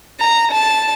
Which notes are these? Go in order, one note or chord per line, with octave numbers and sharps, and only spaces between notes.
A#5
A5